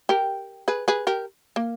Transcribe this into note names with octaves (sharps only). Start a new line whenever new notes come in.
G4 A#4
G#4 B4
G#4 B4
G4 A#4
A#3